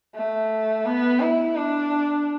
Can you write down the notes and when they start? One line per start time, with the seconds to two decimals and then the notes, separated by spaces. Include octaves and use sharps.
0.15 A3
0.85 B3
1.20 E4
1.56 D4